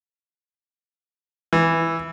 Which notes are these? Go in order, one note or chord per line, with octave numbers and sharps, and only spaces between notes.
E3